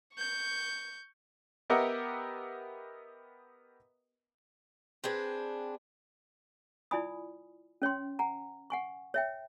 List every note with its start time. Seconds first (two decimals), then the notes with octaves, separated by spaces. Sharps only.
0.15 C#6 G6
1.70 B3 G4 A#4 D#5 E5 F#5
5.04 C4 D4 G#4 B4
6.91 E4 F4 D5 G#5 B5 D#6
7.82 C#4 C#5 G5 C6
8.19 F#5 G#5 A#5
8.70 F#5 G#5 C#6
9.14 C#5 E5 G5